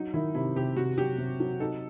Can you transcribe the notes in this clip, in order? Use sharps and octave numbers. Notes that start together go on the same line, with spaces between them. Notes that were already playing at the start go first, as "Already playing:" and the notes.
Already playing: F#3 D#4
D#3 E4
C3 E4
C3 G4
C3 F#4
F#3 G4
C3
F#3
D#4 A4